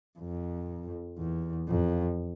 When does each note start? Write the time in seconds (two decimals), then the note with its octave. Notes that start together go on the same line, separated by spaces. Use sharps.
0.19 F2
1.19 E2
1.68 F2